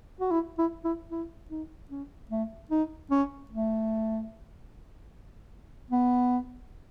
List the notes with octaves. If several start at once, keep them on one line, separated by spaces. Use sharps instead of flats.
F#4
E4
E4
E4
E4
D#4
C#4
A3
D#4
C#4
A3
B3